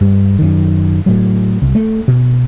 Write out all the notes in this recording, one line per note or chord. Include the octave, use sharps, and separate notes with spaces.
G2
F#2 D#3
A2 F#3
C2
A3
B2